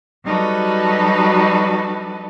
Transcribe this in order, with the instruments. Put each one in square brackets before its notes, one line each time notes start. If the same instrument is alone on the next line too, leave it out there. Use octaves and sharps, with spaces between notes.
[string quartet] F#3 G3 D#4 F#4 A4 B4